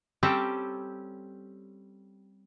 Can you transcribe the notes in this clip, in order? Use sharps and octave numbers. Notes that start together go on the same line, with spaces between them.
G3 C4 C#4 G4 A4 A#5